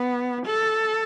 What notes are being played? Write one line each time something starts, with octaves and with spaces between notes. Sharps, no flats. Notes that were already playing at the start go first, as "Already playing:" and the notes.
Already playing: B3
A4